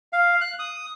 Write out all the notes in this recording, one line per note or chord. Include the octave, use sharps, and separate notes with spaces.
F5
F#6
D#6